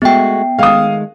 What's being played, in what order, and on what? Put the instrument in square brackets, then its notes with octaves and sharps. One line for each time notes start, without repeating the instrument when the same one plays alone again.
[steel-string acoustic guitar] G#3 A3 F#4 [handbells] B3 G5
[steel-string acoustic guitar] D#3 G#3 A3 [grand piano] F5 D#6